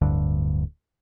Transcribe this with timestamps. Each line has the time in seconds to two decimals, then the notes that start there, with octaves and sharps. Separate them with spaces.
0.02 D1 D2 G2 D3